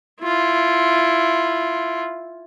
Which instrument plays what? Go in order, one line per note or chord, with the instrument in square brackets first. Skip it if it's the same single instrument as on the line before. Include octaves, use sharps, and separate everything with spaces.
[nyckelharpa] E4 F4